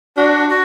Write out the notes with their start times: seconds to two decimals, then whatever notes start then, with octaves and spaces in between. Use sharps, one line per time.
0.16 D4 F#4
0.49 F#4